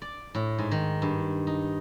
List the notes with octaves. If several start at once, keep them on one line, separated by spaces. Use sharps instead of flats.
D5
A2
G#2
D#3
G2
D#4